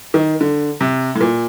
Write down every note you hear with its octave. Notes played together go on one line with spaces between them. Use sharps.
D#3
D3
C3
A2
A#2